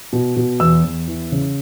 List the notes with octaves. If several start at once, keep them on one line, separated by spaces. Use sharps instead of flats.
B2
B2
E2 E6
E2
E3
C#3